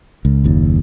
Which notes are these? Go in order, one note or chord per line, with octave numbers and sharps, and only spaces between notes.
C#2
F#1 D#2